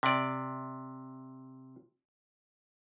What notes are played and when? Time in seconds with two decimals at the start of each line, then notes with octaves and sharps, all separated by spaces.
0.03 C3 D5